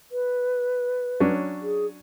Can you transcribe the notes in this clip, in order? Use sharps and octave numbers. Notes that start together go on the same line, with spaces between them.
B4
F#3 C#4 D4
G#4